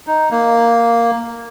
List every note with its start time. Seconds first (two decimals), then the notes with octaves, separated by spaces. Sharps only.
0.07 D#4
0.31 A#3